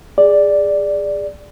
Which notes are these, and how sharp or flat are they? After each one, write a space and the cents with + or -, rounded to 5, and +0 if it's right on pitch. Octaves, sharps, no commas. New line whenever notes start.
G#4 -15 D5 +0